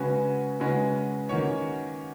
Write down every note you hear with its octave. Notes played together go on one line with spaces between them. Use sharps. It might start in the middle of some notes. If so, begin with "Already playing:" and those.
Already playing: C#3 G#3 C#4 F#4 B4
C#3 G#3 C#4 F#4 B4
D#3 A#3 C#4 F#4 C#5